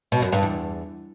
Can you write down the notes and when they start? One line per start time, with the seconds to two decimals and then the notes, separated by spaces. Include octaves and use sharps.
0.12 B2
0.22 F#2
0.32 G2
0.43 E2